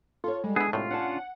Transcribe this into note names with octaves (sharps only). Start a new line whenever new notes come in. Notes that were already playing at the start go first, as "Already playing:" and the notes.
F4 A4 C#5
G3 G#3
B3 D4 E4 G#4
C2 A2 F4
C#4 D4 F#5 A5